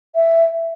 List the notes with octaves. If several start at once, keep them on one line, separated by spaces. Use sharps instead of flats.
E5